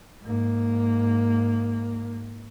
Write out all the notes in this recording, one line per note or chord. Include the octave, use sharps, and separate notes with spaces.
G#2 A#3